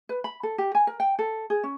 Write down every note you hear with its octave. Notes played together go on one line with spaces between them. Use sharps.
B4
B5
A4
G4
G#5
A#4
G5
A4
G#4
C#4